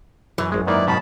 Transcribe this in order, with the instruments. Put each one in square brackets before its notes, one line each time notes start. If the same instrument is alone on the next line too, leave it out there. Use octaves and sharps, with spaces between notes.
[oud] F#2 [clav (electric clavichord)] E3
[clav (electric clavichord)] G#1 G#3
[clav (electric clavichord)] G#2 D#3 A#3 [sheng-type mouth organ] E4 B4 D5
[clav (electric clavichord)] G#2 B2 D#3 [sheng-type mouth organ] A5 B5